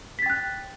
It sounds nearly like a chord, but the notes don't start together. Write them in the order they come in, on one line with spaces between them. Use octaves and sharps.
B6 A6 G5 F#6